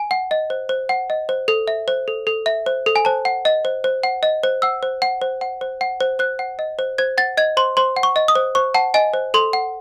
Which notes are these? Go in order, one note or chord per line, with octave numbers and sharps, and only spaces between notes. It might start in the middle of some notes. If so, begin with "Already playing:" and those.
Already playing: G#5
F#5
D#5
C5
C5
F#5
D#5
C5
A4
E5
C5
A4
A4
E5
C5
A4
G#5
C5 A5
F#5
D#5
C5
C5
F#5
D#5
C5
F#5 E6
C5
F#5
C5
F#5
C5
F#5
C5
C5 F#6
F#5
D#5
C5
C5 G#6
F#5 A6
D#5 G#6
C5 C6
C5 C6
F#5
C#6
D#5
D#6
C5
C5 C#6
F#5 A5
D#5 G#5
C5
A4 C6
F#5